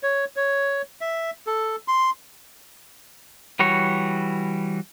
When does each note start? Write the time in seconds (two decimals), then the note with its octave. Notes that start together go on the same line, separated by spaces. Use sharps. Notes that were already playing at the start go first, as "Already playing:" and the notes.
0.03 C#5
0.36 C#5
1.01 E5
1.47 A4
1.88 C6
3.59 E3 G3 F#4 C#5